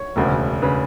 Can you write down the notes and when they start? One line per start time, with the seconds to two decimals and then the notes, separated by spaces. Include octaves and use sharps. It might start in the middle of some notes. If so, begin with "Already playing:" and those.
Already playing: C#5
0.16 E1 D2 C#3
0.62 C#3 B4